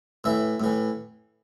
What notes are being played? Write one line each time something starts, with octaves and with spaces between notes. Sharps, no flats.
A2 E3 E5
A2 E3